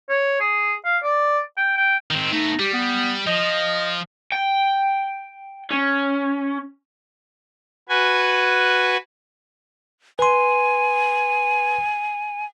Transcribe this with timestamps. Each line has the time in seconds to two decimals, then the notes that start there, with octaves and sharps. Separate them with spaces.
0.09 C#5
0.40 G#4
0.85 F5
1.03 D5
1.57 G5
1.77 G5
2.11 D#3 C4
2.32 A3 B3 D#4
2.59 G3 G4
2.73 B3
3.27 F3 D#5
4.32 G5
5.71 C#4
7.89 F#4 B4 G#5
10.19 B4 G#5 C6